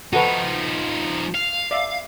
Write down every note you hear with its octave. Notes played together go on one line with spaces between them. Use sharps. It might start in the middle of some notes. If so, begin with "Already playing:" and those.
F3 D#4 F#4 A4 B4
F5
D5 E5